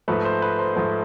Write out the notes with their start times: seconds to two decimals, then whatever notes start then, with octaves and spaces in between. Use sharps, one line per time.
0.08 G#2 F3 A3 B4
0.25 C5
0.42 B4
0.59 C5
0.76 G#2 F3 A3